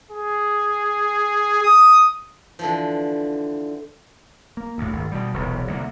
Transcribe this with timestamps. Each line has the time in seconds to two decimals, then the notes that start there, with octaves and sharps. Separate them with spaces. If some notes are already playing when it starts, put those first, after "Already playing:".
0.11 G#4
1.63 D#6
2.59 D3 E3 F3
4.57 A#3
4.78 D2 A2
4.93 G#1
5.12 B2 G3
5.34 E1 B1 C3
5.68 C2 D3 A#3